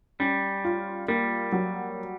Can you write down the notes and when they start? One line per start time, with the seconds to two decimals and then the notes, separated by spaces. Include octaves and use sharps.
0.20 G3 C#4
0.64 F4
1.08 G3 A#3
1.52 F#3